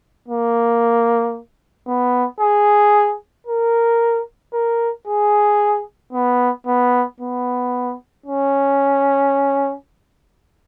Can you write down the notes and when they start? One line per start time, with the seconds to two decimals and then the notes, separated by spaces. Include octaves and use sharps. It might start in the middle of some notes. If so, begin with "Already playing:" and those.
0.28 A#3
1.88 B3
2.40 G#4
3.47 A#4
4.53 A#4
5.08 G#4
6.13 B3
6.67 B3
7.20 B3
8.26 C#4